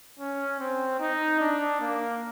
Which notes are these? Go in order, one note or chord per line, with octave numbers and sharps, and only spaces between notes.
C#4
C4
D#4
D4
A#3